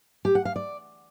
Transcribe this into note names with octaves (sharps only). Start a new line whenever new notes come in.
G4
F#5
F5
D5